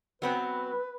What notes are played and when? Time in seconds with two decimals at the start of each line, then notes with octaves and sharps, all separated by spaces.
0.22 F#3 B3 C4 B4